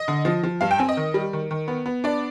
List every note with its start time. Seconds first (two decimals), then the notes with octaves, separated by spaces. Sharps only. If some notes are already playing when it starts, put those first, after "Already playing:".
Already playing: D#5
0.08 D3
0.25 F3
0.43 F3
0.61 G2 F5
0.71 G5
0.79 C4 G#5
0.89 D#5
0.97 D#3
1.14 G3
1.33 D#3
1.51 D#3
1.68 B3
1.86 B3
2.04 D4 D5